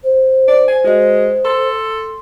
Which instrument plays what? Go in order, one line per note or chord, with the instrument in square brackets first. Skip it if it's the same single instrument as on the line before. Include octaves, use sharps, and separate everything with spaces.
[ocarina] C5
[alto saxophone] D5
G#5
[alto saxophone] G#3 [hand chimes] F#4 D#5
[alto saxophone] A4 [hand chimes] C6